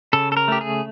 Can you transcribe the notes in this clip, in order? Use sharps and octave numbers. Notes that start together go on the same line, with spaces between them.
C#3 A4
A4
A#4
A3 G4
G#4